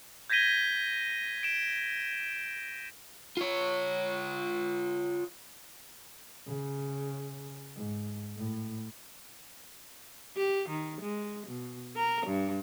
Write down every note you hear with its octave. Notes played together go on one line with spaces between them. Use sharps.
G6 G#6 A#6 B6 D#7 G7
D7 E7
F4 C#5
C#3
G#2
A2
G4
D#3
G#3
B2
A#4
G2